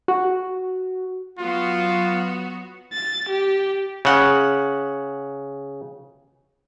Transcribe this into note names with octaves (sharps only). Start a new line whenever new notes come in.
F#4
F#3 B3 F4 F#4
A6
G4
C#3 F#5